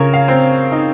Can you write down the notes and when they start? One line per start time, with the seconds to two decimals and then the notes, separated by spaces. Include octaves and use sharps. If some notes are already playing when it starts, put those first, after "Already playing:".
Already playing: C#3 A#4 C#5
0.14 F5
0.28 C4
0.72 D#4